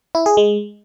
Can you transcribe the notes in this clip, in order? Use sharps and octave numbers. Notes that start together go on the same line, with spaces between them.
E4
G#4
G#3